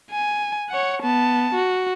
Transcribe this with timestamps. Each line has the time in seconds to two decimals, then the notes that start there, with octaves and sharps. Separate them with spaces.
0.11 G#5
0.70 C#5 F#5
1.02 B3 A5
1.54 F#4